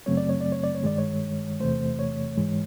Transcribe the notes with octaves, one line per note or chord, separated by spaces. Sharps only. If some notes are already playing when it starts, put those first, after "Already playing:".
F#2 C#3 F#3 A3 C4 C#5
D5
C#5
D5
C#5
D5
C#5
G2 D#3 G#3 D5
C#5
E2 C3 E3 A3 C5
C#5
G#2 E3 G#3